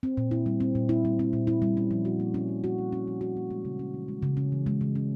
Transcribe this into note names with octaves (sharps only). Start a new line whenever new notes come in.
C4
A#2
E4
G3
C4
A#2
E4
G3
C4
A#2
E4
G3
C#4
F3
F#4
A#3
C#4
F3
F#4
A#3
C#4
F3
F#4
A#3
G#3
C#3
C#4
E3
G#3
C#3
C#4
E3
G#3
C#3
C#4